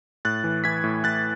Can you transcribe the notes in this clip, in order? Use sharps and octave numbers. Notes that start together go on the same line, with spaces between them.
A2 F#6 A6
E3
E3 G#6 B6
A2
A2 F#6 A6